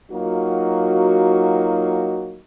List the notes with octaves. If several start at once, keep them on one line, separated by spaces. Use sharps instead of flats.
F#3 A#3 D#4 F4 F#4